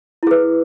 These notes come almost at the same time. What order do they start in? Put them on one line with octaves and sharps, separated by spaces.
E4 G#4 B4